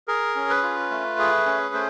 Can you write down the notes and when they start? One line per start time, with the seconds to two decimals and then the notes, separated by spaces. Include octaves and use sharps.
0.08 G#4 A#4
0.36 C#4
0.50 B4
0.63 F4
0.91 A3
1.19 G#4
1.46 C#4
1.74 A3 C5